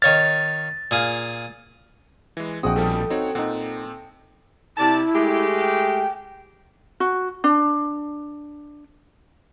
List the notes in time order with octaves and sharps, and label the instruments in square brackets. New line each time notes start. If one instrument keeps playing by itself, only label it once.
[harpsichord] D#3 C#5 F5 [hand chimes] A6
[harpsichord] A#2 G#4 F5
[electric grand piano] E3 G#3
[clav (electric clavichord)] A#1 C4 [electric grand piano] F#4 F#5 [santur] G#4 D#5 G5
[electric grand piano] B2 F3 G3 [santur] A4
[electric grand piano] C4 F#4 C#5 [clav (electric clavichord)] D#4
[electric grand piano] A#2 C4 [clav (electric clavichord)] D#4 F#5
[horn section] C3 D5 A5 [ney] E4
[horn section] G#3 A3 G4
[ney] G5
[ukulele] F#4
D4